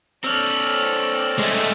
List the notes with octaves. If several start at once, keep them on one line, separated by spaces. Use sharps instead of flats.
C4 A4 C#5 D5 E6 F6
G#3 A3